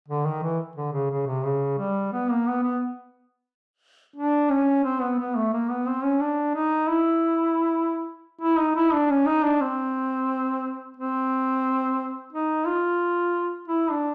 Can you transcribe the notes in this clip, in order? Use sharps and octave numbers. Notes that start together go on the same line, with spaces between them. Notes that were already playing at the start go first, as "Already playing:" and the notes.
D3
D#3
E3
D3
C#3
C#3
C3
C#3
G3
B3
A#3
B3
B3
D4
C#4
C4
B3
B3
A3
A#3
B3
C4
C#4
D4
D#4
E4
E4
D#4
E4
D4
C#4
D#4
D4
C4
C4
D#4
F4
E4
D4